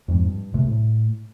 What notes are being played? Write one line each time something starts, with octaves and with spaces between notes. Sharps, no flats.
F2 G#2 F3
G2
B1 C3 A3
A2